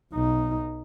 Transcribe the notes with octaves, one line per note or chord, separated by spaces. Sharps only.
B1 D#4